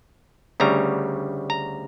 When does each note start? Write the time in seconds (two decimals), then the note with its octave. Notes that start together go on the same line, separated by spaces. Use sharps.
0.60 D2 C#3 G3 A#5
1.50 A#5